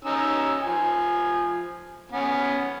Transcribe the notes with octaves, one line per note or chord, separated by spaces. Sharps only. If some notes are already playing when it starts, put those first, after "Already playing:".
C#4 D#4 E6
F3 G#5
B3 C#4